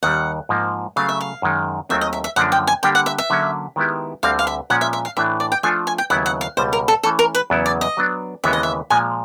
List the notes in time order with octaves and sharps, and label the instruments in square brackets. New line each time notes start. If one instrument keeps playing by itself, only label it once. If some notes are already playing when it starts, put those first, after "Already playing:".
[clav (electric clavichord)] D#2 D#3 G3 [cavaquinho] F#5
[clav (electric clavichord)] G#2 F3 A#3
[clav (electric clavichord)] C#3 F#3 A3 [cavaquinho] F5
[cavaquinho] E5
F5
[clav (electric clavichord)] F#2 D#3 G#3
[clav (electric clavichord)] D#2 D#3 F#3 A3 C4 [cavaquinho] E5
[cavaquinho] D#5
E5
E5
[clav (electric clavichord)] F#2 D3 F3 A#3 D4 [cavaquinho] F#5
[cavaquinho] G5
G#5
[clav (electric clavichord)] D3 G3 A#3 D4 G4 [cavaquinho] G5
[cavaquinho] F#5
E5
E5
[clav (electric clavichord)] D3 F#3 A#3 C#4
D#3 G#3 B3 E4 G4
[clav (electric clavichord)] D2 D3 G3 C4 [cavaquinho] F5
[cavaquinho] F5
E5
[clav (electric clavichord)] A#2 F3 G#3 C#4 [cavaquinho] F#5
[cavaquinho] E5
E5
F5
[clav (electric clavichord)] A2 E3 A3 D4 [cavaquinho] E5
[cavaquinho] D5
G5
[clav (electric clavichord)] F3 A3 D4 F4 A4 [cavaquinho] G#5
[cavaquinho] G#5
G5
[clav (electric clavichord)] D#2 C#3 F#3 B3 E4 [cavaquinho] F#5
[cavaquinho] F#5
F5
[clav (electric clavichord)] C#2 B2 G3 [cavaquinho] C5
[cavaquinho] A#4
A4
[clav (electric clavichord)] E3 A3 C#4 [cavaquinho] A4
[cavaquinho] A#4
B4
[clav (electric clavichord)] E2 C#3 F#3 B3 E4
[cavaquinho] D5
D#5
[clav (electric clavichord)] F#3 B3 D4
[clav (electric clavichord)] D#2 C#3 E3 G#3 B3 [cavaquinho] E5
[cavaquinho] D#5
E5
[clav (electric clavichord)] A#2 F3 G#3 [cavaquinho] G#5